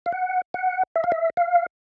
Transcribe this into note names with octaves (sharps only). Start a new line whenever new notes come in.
F5
F#5
F#5
E5
F5
E5
F5